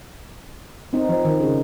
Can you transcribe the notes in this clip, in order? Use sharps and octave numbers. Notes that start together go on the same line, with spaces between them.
C4 D#4
F3
D#3
C#3